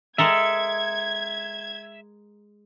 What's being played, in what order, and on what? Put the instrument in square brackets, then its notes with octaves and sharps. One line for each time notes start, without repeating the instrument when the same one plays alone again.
[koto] G#3 A4 A#4 [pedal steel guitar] E5 [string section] G#6